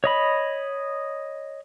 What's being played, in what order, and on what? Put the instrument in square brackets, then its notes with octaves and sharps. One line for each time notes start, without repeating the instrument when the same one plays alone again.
[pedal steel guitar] C#5 D#5 B5